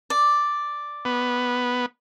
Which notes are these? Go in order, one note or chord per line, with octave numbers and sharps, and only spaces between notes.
D5
B3